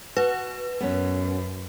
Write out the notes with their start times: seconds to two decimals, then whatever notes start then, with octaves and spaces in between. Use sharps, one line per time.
0.17 F#4 B4
0.81 F#2 B3 C#4